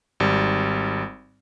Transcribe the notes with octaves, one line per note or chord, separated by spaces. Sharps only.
G#1 G3